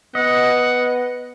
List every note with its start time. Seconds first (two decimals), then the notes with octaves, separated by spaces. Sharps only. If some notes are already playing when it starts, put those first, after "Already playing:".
0.15 B3 D#5 F#5